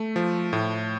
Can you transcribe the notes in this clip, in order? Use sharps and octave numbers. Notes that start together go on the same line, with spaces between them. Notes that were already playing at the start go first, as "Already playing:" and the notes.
Already playing: A3
F3
A2